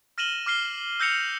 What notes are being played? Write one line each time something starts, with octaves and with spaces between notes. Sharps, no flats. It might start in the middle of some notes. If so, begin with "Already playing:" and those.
F6 A#6 D#7 E7 F#7 G7
D6 F6 C7 G7
E6 G6 A#6 C#7 F7